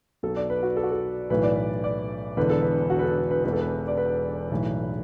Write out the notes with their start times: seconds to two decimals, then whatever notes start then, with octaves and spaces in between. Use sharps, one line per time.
0.23 B1 B2 A4
0.36 D5
0.50 B4
0.63 F#4
0.77 A4
0.83 F#4
0.91 A4
1.30 B1 A2 E3 B4
1.43 D5
1.56 B4
1.84 D5
2.37 E1 E2 D3 B4
2.50 A4
2.62 B4
2.90 F#4
2.99 B4
3.04 A4
3.31 B4
3.44 E1 E2 E3 B4
3.53 A4
3.61 B4
3.88 D5
3.97 B4
4.51 B1 A2 E3